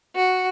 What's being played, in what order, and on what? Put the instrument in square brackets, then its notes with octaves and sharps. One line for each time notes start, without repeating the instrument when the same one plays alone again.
[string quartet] F#4